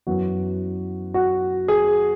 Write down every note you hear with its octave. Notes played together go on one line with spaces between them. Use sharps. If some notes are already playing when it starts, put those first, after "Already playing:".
F#2 E3 B3 F#4
F#4
G#4